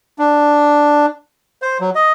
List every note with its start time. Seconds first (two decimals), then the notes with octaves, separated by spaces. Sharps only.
0.19 D4
1.62 C5
1.80 F#3
1.95 D#5